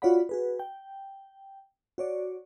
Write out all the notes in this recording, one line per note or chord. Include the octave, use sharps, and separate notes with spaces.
F4 F#4 C#5 D5 F#5 B5
F#4 G#4 B4
G5
F#4 C#5 D5